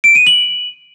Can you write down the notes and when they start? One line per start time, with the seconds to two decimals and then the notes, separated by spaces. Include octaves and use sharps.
0.04 D7
0.15 D#7
0.27 F#7